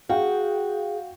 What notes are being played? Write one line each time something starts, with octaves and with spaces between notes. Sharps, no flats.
F#4 G#4 F5 G5